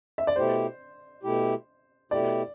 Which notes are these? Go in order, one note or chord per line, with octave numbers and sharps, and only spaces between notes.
E5
D5
B2 A3 E4 G4 C5
B2 A3 E4 G4
B2 A3 E4 G4 D5